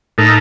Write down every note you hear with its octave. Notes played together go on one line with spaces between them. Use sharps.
A2 A3 D#4 A#4